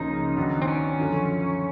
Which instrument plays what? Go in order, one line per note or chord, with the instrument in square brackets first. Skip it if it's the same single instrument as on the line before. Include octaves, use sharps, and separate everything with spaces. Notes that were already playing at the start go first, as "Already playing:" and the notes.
Already playing: [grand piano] C#2 C#3 F3 A#3 C#4 [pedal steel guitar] D#4
[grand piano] D#3 F#3 B3 D4
[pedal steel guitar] C4
C#4
[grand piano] F#2 D3 F3